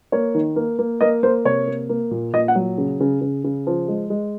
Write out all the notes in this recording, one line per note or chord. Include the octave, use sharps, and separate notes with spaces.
A#3 C#5
D#3
A#3
A#3
A#3 D#5
A#3 C5
C3 C#5
A#3
A#3
A#2
A#2 D#5
F#5
F#3
C#3
C#3
C#3
C#3
F3
G#3
G#3